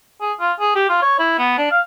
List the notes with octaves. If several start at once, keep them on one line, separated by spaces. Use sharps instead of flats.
G#4
F4
G#4
G4
F4
C#5
E4
B3
D4
F5